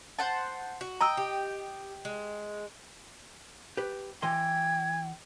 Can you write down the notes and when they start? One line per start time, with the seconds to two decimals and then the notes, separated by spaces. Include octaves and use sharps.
0.19 C5 F#5 A5
0.81 F#4
1.01 D#5 G5 A#5 E6
1.17 G4
2.05 G#3
3.77 G4 B4
4.22 E3 D#5 G5 C6 G#6